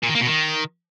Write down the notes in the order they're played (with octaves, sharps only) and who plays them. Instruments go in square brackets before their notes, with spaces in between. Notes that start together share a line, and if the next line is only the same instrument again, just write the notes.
[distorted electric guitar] A#2
D#3
A#3
B2
D#3